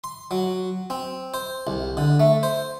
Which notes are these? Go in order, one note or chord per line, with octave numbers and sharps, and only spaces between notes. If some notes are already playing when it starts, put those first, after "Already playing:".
C6
F#3
C4
C5
C2
D3
A3
C5